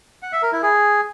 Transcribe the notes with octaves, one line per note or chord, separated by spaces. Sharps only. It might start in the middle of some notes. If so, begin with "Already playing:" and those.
F#5
E5
A#4
E4
G#4